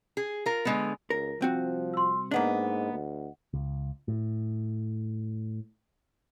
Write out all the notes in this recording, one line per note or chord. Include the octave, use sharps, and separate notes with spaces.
G#4
F4 A#4
D3 G#3 B3
C#2 A#4
C2 F3 C4 F#4
C6 E6
G#2 A#3 B3 D4 D#5 F#5
D2
C#2
A2